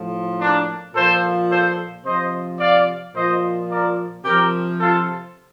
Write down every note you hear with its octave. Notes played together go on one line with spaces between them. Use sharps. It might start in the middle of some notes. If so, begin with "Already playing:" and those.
Already playing: A2 F3
A#3 D4
A#2 F3 A4 C5
A4 C5
C3 F3 C5 D#5
D5 F5
A#2 F3 C5 D#5
A#4 D5
C3 F3 G4 A#4
F4 A4